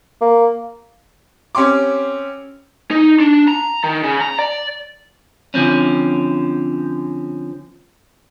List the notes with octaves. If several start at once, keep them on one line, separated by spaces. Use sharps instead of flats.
A#3
C4 C#4 G4 C6 D6
D#4
D4
A#5
D#3
C#3
A#5
D5
D3 F3 C4 C#4